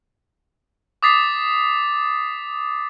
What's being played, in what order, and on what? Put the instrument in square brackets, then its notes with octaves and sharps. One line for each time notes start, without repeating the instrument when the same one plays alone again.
[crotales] D6 D#6 A6 B6 C7